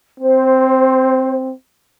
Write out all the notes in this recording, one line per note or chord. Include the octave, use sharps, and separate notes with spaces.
C4 C5